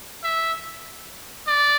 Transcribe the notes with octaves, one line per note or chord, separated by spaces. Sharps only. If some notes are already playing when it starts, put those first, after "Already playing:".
E5
D5